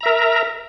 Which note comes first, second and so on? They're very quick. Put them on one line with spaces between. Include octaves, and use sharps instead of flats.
A#5 E5 A#4